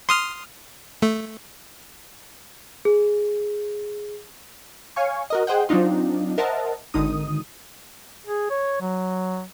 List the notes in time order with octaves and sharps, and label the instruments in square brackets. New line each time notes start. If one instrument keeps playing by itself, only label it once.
[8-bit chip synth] C6 D#6 F6
A3
[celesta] G#4
[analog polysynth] C#5 F5 G#5 C#6
F#4 A#4 D#5
G#4 C5 D#5 F#5 G5
F#3 C4 D4 D#4 F4
A#4 C5 D#5 E5 F#5 A5
G#1 D3 D#3 D#4 D#6
[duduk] G#4
C#5
F#3